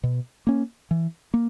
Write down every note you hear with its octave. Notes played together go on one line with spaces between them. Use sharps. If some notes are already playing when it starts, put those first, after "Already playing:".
B2
A#3 C#4
E3
A#3